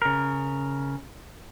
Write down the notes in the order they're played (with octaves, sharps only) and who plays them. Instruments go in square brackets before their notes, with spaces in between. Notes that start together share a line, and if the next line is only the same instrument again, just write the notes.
[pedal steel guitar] C#3 A#4